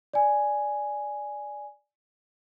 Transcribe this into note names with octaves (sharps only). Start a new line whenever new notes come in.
D5 G#5